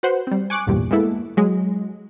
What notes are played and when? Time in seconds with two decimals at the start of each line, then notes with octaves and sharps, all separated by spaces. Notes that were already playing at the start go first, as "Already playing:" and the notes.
0.03 F#4 B4 C5 F#5
0.27 G3 C4
0.50 G#5 C#6 D6 F#6
0.67 A1 E2 G2 A#2 G3
0.91 G#3 A#3 B3 E4 A4
1.37 F#3 G#3